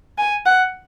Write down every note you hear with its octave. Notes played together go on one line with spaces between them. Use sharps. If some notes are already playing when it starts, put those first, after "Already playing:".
G#5
F#5